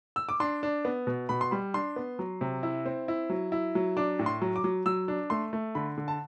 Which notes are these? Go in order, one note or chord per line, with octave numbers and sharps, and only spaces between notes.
E6
D6
D4 C6
D4
B3
B2
B2 B5
C6
G3 B5
D4 C6
B3
F#3
C3
E4
C4
E4
F#3
E4
F#3
D4 D6
A2
C6
F#3
D6
F#3
F#3 E6
D4
A3 C6
A3
D3 B5
D3
A5